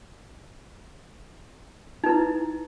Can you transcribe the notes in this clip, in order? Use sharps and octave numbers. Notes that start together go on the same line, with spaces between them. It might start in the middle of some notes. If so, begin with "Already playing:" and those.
D#4 E4 B4